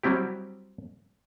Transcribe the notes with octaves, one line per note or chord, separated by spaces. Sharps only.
F#3 G3 C4 E4 G4